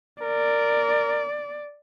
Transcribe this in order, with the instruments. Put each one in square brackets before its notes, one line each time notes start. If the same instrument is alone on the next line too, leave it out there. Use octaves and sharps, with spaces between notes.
[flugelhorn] A#4 [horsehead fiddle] D5